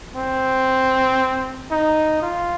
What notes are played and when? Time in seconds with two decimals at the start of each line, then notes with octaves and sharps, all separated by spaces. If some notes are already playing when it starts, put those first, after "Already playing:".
0.15 C4
1.71 D#4
2.22 F4